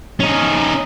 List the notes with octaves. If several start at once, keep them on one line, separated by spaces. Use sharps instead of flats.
C#4 D#4